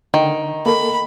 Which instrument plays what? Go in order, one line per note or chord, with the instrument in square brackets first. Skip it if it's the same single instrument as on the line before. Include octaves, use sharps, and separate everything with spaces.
[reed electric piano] D3 [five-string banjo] D#3
[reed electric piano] A#3 A4 A#4 [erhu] B5